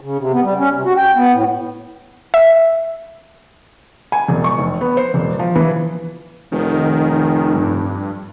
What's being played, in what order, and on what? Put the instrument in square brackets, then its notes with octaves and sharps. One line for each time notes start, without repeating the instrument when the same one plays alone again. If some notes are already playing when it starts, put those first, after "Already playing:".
[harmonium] C#3
C3
B3
G3
C#4
C3
F#4
G5
B3
A2
[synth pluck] E5
[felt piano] G#5
E1
C#6
F1
B3
C5
E1
F3
E3
[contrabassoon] F1 [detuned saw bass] D#3
[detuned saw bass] G2